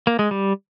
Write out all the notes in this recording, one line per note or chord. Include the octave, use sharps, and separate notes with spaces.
A#3
G#3
G3